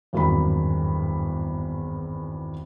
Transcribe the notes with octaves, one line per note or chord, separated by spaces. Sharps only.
G#1 E2 G2 F#3 A#4 B5